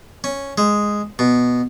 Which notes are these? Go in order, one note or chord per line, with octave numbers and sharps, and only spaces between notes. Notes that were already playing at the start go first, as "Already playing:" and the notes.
C#4
G#3
B2